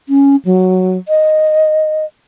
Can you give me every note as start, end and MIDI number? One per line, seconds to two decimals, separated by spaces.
0.09 0.36 61
0.45 0.98 54
1.08 2.05 75